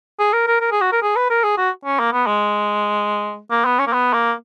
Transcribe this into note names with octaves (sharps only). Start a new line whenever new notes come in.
G#4
A#4
A#4
A#4
G#4
F#4
A#4
G#4
B4
A#4
G#4
F#4
C#4
A#3
B3
G#3
A#3
B3
C#4
A#3
B3
A#3